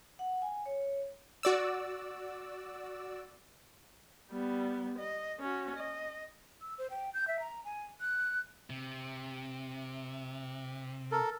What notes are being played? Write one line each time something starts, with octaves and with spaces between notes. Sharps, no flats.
F#5
G#5
C#5
F#4 D5 E6
G3 B3
D#5
C#4 F#4
D#5
E6
C5
G5
G6
E5
A#5
G#5
F#6
C3
A4 A#4